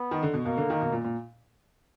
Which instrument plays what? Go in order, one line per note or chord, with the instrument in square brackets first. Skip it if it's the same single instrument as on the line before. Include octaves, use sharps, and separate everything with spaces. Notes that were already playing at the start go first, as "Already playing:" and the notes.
Already playing: [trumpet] B3
[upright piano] D#3
D3
B2
[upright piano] B2 [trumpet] A#3
[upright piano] D3
D#3
B2
A#2
A#2